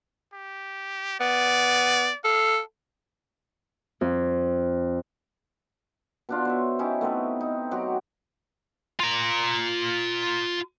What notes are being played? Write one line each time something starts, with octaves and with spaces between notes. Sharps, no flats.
G4
B3 D5
A4 F5
F2
B2 D4 F4
C5 C#5 E5
C#4 D#4 E4 G4
A3 B3 C4 B4
D#4
F#3 C4 F#4 G4
F4 A#5